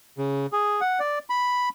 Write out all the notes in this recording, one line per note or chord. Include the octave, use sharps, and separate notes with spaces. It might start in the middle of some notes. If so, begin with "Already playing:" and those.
C#3
G#4
F#5
D5
B5